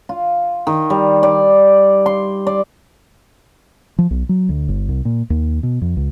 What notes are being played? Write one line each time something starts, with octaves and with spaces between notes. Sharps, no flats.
F4
D#3
G3
D5
C6
D5
F3
B1
F#3
D2
G1
C2
A#2
D#2
B2
F2
C#2